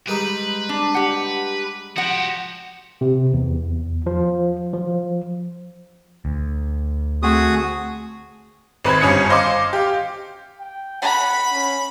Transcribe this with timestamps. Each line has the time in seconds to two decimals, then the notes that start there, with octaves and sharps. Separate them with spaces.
0.08 G3 G#3 D#4 B4
0.69 D4
0.94 G4 F#5
1.96 F3 F#4 G4 F#5
3.01 C3
3.34 E2
4.06 F3
4.73 F3
6.25 D2
7.23 A3 C4 F#4 G#4 D#6
8.84 G#1 B4 C5 B5 G#6
9.01 G1 G2 C#4 D#6 G#6 C#7
9.29 C5 D#5 F5 C6 D6
9.73 G4 F5
10.60 G5
11.02 F#5 B5
11.53 C#4